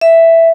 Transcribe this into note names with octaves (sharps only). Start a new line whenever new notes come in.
E5